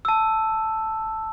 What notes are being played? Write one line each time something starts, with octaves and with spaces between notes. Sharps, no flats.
A5 E6